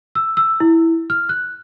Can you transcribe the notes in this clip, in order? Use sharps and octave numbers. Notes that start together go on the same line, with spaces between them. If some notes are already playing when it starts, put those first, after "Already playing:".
E6
E6
E4
F6
F#6